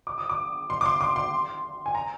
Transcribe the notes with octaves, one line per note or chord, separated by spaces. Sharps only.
D6
D#6
D6
C6
D6
C6
D6
C6
G#5
A#5